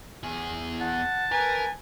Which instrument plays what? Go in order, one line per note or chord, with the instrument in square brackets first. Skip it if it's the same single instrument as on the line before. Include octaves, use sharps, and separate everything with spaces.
[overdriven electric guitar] E2 G#4
[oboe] F#5 [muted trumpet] A5
[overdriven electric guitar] A#4 [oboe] B4 [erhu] G#5